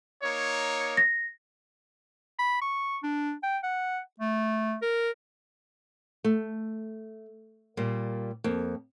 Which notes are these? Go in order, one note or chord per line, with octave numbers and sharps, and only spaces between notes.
A#3 D#4 C#5
A#6
B5
C#6
D4
G5
F#5
A3
A#4
A3
A#2 G3 A#3
F2 A#3